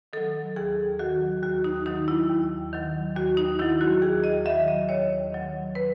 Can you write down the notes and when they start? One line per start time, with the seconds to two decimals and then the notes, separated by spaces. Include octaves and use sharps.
0.13 D#3 F#3 A4
0.56 D#2 G#4
0.99 D#3 F#3 F#4
1.43 D#2 F#4
1.64 D#4
1.86 D#3 F#3 D#4
2.08 E4
2.29 D#2
2.73 D#3 F#3
3.15 D#2 F#4
3.37 D#4
3.59 D#3 F#3 E4
3.81 F#4
4.02 D#2 G#4
4.24 D#5
4.45 D#3 F#3 E5
4.68 D#5
4.89 D#2 C#5
5.32 D#3 F#3
5.75 B4